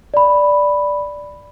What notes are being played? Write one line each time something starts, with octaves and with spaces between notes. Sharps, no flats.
D5 B5